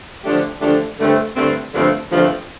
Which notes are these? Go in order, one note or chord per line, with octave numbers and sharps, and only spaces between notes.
D3 F3 A3 D4 G4
D3 F3 A3 D4 G4
G2 D3 A3 C4
G2 D3 A3 C4
G2 D3 F3 A3 C4
G2 D3 F3 A3 C4